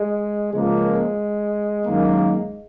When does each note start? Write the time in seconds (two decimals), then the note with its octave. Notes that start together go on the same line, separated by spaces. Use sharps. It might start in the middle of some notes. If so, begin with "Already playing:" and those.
Already playing: G#3
0.53 C#2 C#3 F3 G#3 A#3
1.87 F#2 D#3 F#3 A#3